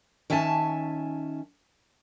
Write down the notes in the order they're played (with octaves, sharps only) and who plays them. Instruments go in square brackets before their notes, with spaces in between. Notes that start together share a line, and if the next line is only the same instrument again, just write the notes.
[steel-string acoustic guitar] D#3 C#4 E5 G#5 A5